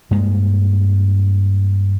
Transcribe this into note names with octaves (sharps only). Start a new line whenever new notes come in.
G2 G#3 A#3